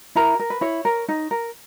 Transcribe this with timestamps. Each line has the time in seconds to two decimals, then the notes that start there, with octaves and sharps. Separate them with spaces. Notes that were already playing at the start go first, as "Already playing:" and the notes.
0.15 E4 A#4 A#5
0.39 A#4
0.50 B4
0.61 E4 C#5
0.85 A#4
1.08 D#4
1.31 A#4